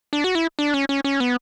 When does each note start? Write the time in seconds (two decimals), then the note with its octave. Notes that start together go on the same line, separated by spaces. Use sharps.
0.13 D4
0.24 F#4
0.35 E4
0.59 D4
0.74 C#4
0.89 C#4
1.04 C#4
1.20 B3